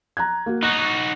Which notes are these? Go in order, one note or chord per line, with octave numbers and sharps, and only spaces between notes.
A#5 F#6 G#6
A#3 F#4
D#4 F#4 F#6